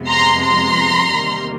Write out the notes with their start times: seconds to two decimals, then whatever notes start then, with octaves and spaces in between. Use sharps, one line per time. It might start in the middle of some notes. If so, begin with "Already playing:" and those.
Already playing: F2 C3 F3 G#3 B3
0.09 A#5 C6
0.43 A#5 C6
1.13 E2 C3 D#3 G3 A#3